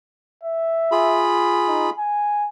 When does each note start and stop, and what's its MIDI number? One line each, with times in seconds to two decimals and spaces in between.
0.43 1.25 76
0.92 1.90 65
0.92 1.90 68
0.92 1.90 83
1.68 1.87 63
1.98 2.48 80